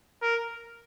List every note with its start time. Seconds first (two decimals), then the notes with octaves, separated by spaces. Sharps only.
0.22 A#4